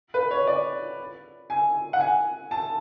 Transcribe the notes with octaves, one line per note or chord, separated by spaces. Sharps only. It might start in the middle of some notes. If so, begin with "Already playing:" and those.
B4
C#5
D5
G#5
F#5
G#5
A5